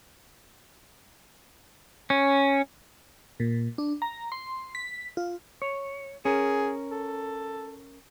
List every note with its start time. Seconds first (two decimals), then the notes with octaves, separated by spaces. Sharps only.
2.10 C#4
3.40 A#2
3.78 D4
4.02 A#5
4.32 C6
4.75 B6
5.17 F4
5.62 C#5
6.25 C#4 G#4 A#4
6.91 A4